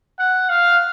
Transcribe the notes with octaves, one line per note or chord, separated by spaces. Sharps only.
F#5
F5